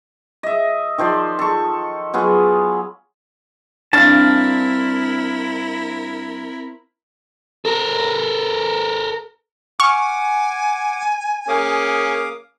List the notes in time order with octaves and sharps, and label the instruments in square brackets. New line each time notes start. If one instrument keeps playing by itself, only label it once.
[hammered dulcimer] D#5 E5
D#3 F3 C5 D5
A4 C#6
F#3 B3 F4 G#4
[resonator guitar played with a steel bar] G2 D4 [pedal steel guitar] C4 F5 A5 [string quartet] E4 A#4 [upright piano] A6
[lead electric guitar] A4 A#4
[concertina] F#5 D6 [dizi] G#5 [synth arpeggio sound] C#6 F6
[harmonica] A#3 C#4 G#4 [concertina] F5 D6 D#6